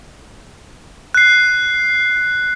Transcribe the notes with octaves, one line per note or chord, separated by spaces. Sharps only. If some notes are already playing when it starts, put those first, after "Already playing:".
F#6 C7